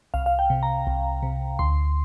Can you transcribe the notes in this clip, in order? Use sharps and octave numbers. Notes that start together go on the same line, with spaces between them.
C2 F5
F5
G5
C3
A#5
C2
C3
D2 C6